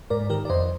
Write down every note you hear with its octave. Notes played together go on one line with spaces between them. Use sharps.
G#2 A#4 D5
D#3 G4 A#4
D5
F2 C5 D#5